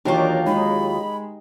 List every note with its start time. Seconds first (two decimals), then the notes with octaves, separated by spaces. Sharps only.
0.05 D#2 E3 F#3 D4 D#4 F4 G4 A#4
0.47 G#3 D#4 B5